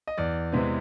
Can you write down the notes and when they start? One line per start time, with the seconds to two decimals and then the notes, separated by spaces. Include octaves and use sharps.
0.07 D#5
0.18 E2 D5
0.53 C3 E3 G#3 B3